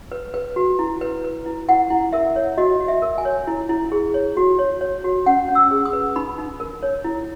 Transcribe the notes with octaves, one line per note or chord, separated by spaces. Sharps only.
B4
B4
F#4
E4
B4
B4
E4
E4 F#5
E4
A#4 E5
C#5
F#4 D#5
F#4
E5
A#4
G#5
C#5
E4
E4
G#4
C#5
F#4
C#5
C#5
F#4
C#4 F#5
C#4
E6
G#4
D#6
B4
D#4 B5
D#4
A#4
C#5
E4